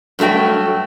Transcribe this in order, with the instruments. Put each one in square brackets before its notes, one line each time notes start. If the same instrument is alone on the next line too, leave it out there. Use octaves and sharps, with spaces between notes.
[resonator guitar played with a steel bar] G2 F#3 A3 F#4 G5